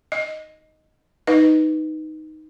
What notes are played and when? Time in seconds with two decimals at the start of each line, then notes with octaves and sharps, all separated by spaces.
0.12 D#5
1.27 D#4 B4 D#5